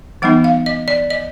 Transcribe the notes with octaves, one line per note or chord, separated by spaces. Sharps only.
E3 G3 B3 D#4 F#5
F5
D#5
D5
D#5